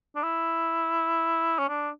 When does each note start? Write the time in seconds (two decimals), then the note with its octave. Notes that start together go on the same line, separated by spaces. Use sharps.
0.16 D4
0.23 E4
1.59 C#4
1.69 D4